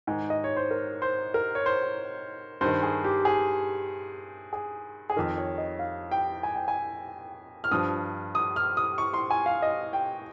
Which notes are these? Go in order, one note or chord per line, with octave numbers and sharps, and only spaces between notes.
G#2 D#3 G#5
D#5
C#5
C5
A#4
C5
A#4
C#5
C5
G2 D#3 C5
G#4
G4
G#4
G#4
G#4
F2 D#3 A#4
C#5
D#5
F5
G5
G#5
G5
G#5
F6
G2 F3 D#6
D#6
F6
D#6
C#6
C6
G#5
F5
D#5
G5